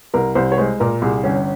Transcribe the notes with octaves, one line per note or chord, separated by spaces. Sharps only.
C2 A#4
C2 C5
C#5
G#3 C5
A#2 A#4
C2 G#4
G1 C#4